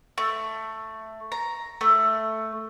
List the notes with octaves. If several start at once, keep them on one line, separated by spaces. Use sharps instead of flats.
A3
A#5
A3